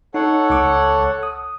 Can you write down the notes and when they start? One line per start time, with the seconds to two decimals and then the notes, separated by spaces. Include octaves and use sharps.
0.14 D#4 A4 C#5 F#5
0.50 C#2 D6
1.23 D#6